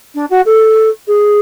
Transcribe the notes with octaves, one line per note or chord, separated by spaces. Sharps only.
D4
F#4
A4
G#4